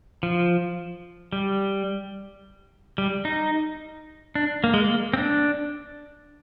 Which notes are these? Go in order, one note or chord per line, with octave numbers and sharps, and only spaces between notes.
F3
G3
G3
D#4
D4
A#3
G#3
A#3
C4
D4